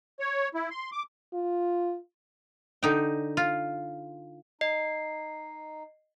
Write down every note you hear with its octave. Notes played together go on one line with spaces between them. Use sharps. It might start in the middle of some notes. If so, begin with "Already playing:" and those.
C#5
E4
C6
D6
F4
D3 D#4 G5
F4
D#4 D#5 C7